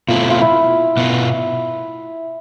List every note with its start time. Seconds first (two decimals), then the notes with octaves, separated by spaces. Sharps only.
0.08 B2 A3 C4 E4 F4
0.30 F4
0.41 E4
0.97 B2 B3 F4